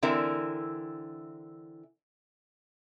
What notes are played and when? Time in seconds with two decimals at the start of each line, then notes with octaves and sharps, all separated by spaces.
0.03 D3 E3 C4 E4 A#4 E5